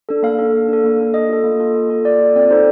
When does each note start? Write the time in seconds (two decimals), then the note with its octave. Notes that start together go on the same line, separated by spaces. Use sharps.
0.09 D4 A4
0.23 A#3 F5
0.39 D4 A4
0.54 A#3
0.69 D4 A4
0.84 A#3
0.99 D4 A4
1.14 A#3 D#5
1.29 F4 A4
1.44 A#3
1.60 F4 A4
1.75 A#3
1.90 F4 A4
2.05 A#3 D5
2.20 F4 A4
2.36 C4 D5
2.50 D#4 A4 C5